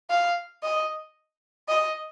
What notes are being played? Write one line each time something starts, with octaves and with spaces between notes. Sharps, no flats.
F5
D#5
D#5